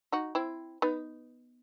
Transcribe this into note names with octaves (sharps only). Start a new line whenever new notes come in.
D#4 F#4
C4 E4
B3 D#4